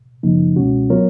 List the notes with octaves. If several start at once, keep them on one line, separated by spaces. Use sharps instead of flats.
F#2 C#3 F3 A#3 D#4
C#2 B2 G#3 C#4 F#4
F#3 B3 F4 A#4 C#5